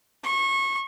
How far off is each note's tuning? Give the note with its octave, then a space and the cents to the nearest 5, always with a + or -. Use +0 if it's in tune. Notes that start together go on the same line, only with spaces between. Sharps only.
C#6 -25